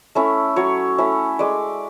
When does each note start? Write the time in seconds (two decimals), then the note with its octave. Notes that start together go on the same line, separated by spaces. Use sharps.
0.15 A3 C#4 E4
0.56 F#3 C#5
0.98 A3 C#4 E4
1.39 G#3 D5